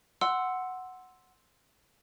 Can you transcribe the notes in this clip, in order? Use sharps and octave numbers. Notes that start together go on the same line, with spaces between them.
F#5 C6 E6